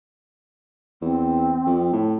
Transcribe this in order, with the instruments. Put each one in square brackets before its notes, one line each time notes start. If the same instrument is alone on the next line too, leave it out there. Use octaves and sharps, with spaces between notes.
[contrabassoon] E2 [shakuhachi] C4
[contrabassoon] F2
A2